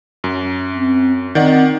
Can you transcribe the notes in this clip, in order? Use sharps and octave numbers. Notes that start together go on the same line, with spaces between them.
F#2
C4
D#3 C4 D5 F#5